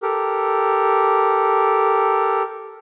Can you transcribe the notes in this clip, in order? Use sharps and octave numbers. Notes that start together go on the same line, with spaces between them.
G4 A4 A#4